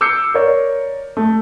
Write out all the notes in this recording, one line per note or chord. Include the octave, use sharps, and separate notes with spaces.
D6 E6 F6 G6 C7 C#7
A#4 C#5 D5
A3